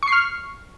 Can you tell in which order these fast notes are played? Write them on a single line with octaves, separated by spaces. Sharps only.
C#6 C7 F6